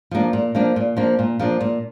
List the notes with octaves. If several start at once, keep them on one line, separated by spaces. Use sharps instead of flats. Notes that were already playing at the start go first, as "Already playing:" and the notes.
F3 A#3 D4
A#2
F3 A#3 D4
A#2
F3 A#3 D4
A#2
F3 A#3 D4
A#2